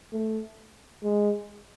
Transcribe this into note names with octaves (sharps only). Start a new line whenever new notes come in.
A3
G#3